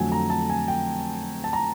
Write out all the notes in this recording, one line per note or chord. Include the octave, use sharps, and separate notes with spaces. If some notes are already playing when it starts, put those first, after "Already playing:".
Already playing: F2 D3 F#3 A3 G#5
A#5
A5
G#5
G5
A5
A#5